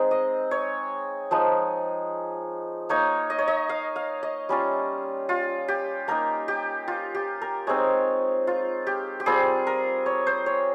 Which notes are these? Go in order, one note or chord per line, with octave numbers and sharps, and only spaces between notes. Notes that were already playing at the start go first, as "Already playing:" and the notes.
Already playing: G#3 C4 D#4
D#5
C#5
F3 G#3 D#4
A#3 D#4 C#5
D#5
C#5
D#5
F5
F5
D#5
G3 C#4 F4
F4
G4
A#3 D#4 A#4
G4
F4
G4
A#4
G#3 C4 D#4 C#5
F4
G4
G4
G3 C4 F4 G#4
A#4
C#5
C5
C#5